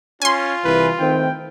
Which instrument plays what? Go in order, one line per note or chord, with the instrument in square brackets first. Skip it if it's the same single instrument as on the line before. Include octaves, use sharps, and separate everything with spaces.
[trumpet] C#4 [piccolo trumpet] F4 [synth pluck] G#5 C6
[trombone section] C2 E3 [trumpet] B4
[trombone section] D#3 A3 C4 [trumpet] G5